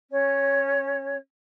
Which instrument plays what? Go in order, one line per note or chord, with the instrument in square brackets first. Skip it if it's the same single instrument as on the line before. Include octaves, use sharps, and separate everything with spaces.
[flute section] C#4 C#5